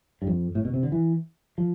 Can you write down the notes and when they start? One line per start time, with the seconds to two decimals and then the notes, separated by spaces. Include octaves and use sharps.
0.22 G2
0.27 F2
0.55 A2
0.65 B2
0.74 C3
0.83 D3
0.92 E3
1.58 F3